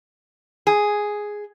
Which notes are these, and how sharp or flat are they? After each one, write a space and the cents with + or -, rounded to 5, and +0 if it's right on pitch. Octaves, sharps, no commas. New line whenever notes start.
G#4 +0